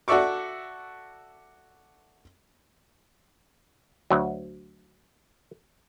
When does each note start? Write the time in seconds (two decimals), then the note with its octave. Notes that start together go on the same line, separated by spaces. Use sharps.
0.08 F#4 A4 D5 E5 C#6 D6
4.10 D2 F#3